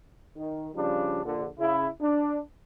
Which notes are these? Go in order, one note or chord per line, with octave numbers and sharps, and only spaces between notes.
D#3
C#3 F3 G3 D4
A#1 D3
C#3 E4
D4